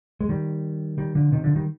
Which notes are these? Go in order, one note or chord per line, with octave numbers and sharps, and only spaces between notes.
G#3
D#3 G3
D#3 G3
D3 F3
C3 D#3
D3 F3
D#3 G3